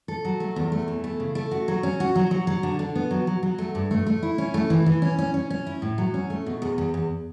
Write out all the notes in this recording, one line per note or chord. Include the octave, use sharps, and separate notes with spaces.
A4
F#3
A3
E2
A3
E3
A3
C#3
A3
F#4
F#3
C#4
F#4
F#3
F#3
F#3
D3
D3
B3
F#3
F#3
F#3
A3
G2
A3
A3
E4
C#4
A3
E3
E3
C#4
C#4
C#4
C#4
E4
A2
F#3
C#4
A3
B2
E2
E2
E2